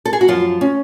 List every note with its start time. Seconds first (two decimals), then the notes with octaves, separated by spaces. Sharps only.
0.05 A4
0.13 G#4
0.21 F#4
0.28 F#2 F3 F4
0.61 C#4